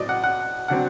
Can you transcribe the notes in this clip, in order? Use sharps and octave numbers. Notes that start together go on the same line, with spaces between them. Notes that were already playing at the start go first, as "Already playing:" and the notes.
Already playing: A2 F#3 C4 D5 D#5
F#5
F#5
D3 F#3 C4 F#5